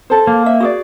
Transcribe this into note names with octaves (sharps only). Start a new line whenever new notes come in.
A4 C5
A#3
E5
F#4 G#4 D5